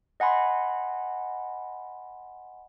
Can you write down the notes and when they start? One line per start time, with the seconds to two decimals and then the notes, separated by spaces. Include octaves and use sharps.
0.20 D#5 F#5 G#5 B5 C6